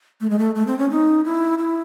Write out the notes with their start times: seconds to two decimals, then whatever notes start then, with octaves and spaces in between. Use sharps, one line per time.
0.21 A3
0.30 G#3
0.39 A3
0.55 A3
0.67 C4
0.79 C#4
0.91 D#4
1.25 E4
1.59 E4